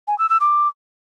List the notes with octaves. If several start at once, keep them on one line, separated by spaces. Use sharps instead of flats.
G#5
E6
E6
D6